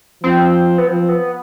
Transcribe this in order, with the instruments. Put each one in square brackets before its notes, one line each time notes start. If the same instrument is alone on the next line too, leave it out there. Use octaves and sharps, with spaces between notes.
[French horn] F3 [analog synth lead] C4
[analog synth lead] B3
[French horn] F3 [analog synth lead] C4
[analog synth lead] B3